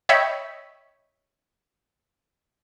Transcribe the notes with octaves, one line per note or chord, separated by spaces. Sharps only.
C#5 D#5 E5 G5 B5